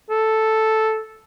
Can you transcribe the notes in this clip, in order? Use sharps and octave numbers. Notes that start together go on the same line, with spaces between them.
A4